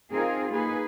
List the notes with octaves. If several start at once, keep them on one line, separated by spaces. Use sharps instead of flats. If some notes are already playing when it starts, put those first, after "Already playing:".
C4 D#4 F4 G#4 A#4
A#3 D#4 G#4 B4